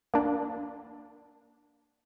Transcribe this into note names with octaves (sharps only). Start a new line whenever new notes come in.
A#3 D4